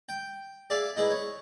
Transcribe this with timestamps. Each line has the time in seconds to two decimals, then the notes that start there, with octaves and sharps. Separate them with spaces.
0.09 G5
0.70 G#4 D5 E5 F5
0.96 D#4 E4 G#4 B4
1.11 C#5